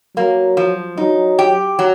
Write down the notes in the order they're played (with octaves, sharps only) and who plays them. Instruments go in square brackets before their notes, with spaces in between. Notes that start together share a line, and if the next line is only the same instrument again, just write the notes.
[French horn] F#3 [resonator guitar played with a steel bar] A#3
[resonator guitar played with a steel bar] F3
[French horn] F#3 [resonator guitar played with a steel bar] D#4
[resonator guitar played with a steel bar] G4
F#3